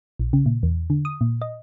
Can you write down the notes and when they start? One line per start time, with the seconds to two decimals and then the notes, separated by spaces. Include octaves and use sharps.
0.19 A#1
0.33 C#3
0.46 A#2
0.63 E2
0.90 D3
1.05 D#6
1.21 A#2
1.42 D#5